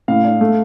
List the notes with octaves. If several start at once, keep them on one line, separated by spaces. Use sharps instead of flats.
A2 F5
D4
A3